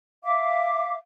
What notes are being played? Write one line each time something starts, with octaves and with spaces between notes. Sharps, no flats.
E5 F5 D6